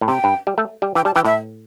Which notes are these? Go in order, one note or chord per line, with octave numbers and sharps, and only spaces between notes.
A2
C3 G5
G2
G3
A3
G3
E3 G5
G3 A5
E3 G5
A2 E5